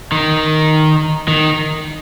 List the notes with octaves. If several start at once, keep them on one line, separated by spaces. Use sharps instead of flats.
D#3
D#3